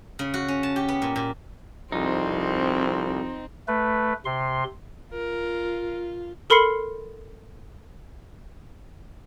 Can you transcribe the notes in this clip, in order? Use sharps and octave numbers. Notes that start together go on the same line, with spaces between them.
C#3
F#4
C#4
A5
G4
B3
A#2
A#2
C2 F2 C4 D#4
A3 B4
C3 C6
F4 A#4
A4 A#4 B5 C6 C7 C#7